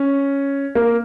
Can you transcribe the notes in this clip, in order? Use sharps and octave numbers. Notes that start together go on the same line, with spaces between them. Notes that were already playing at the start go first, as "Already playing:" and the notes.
Already playing: C#4
A#3